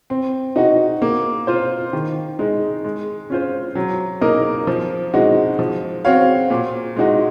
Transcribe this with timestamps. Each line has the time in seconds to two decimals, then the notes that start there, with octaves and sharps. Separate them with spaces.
0.10 C4
0.56 D#4 F#4
1.02 A#3
1.47 F4 C5
1.93 D#3
2.39 G#3 D#4
2.85 G#3
3.30 C#4 F4 C5
3.75 F#3
4.21 A#3 D#4 A#4 D#5
4.67 F3
5.14 G#3 D#4 F#4
5.59 F3
6.05 C4 F#4 C#5 F5
6.50 A#2
6.96 G#3 D#4 F#4